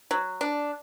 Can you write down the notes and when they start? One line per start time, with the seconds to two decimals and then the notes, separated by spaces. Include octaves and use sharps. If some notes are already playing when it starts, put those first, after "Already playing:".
0.11 F#3
0.41 D4